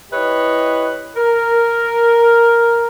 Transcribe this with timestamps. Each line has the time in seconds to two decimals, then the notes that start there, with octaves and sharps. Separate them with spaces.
0.13 E4 G4 B4 C#5 D#5
1.16 A#4